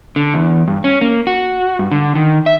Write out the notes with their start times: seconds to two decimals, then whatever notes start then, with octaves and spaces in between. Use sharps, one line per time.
0.16 D3
0.34 E2
0.68 G2
0.84 C#4
1.01 A#3
1.27 F#4
1.79 G2
1.91 D3
2.15 D#3
2.46 E5